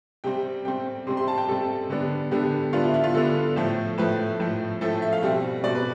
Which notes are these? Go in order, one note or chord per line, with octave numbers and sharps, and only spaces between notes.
C3 G3 C4 G5
C3 G3 C4 G5
C3 G3 C4 C6
C6
A5
G5
C3 G3 C4 A4
D3 G3 B3 D4
D3 G3 B3 D4 G4
D3 G3 B3 D4 F4
E4
E4
F4
D3 G3 B3 D4 A4
A2 F3 A3
A2 F3 A3 B4
A2 F3 A3
A2 F3 A3 A4
E5
F5
B2 G3 C4 E5
B2 G3 C4 D5
B4